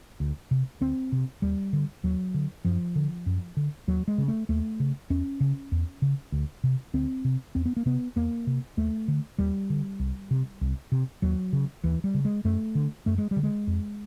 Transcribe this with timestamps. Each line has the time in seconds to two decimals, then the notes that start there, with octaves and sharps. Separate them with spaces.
0.20 D2
0.51 C3
0.81 D2 C4
1.12 C3
1.42 D#2 G3
1.73 D3
2.03 D#2 F#3
2.34 D3
2.65 F#2 F3
2.96 D3
3.26 F#2
3.57 D3
3.87 D#2 F#3
4.08 G#3
4.18 C#3
4.28 A3
4.49 D#2 A3
4.80 C#3
5.10 E2 C#4
5.40 C#3
5.72 E2
6.02 C#3
6.32 D2
6.64 C3
6.94 D2 C4
7.25 C3
7.55 E2 C4
7.66 B3
7.77 A#3
7.86 C3 B3
8.16 E2 A#3
8.47 C3
8.77 D#2 A3
9.08 D3
9.38 D#2 G3
9.70 D3
9.99 C2
10.31 C3
10.61 C2
10.92 C3
11.22 D#2 F#3
11.53 C#3
11.84 D#2 E3
12.04 G3
12.14 C#3
12.25 G#3
12.45 F#2 A3
12.75 D3
13.06 F#2 A3
13.18 G#3
13.31 G3
13.36 D3
13.43 G#3
13.67 F2